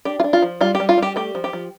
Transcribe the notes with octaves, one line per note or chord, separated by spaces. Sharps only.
D4 G4
F4
D4
F4
F3
G3 F4
G4
G3
F4
G3 G4
A3 G4
F3
G4
F3